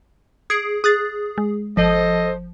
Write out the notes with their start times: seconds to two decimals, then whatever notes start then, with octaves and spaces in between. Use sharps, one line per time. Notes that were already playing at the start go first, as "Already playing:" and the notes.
0.50 G#4 G#6 C7 D7
0.84 G#4 D#6 F#6 A6
1.38 G#3
1.77 G1 F3 A4 C5 D#5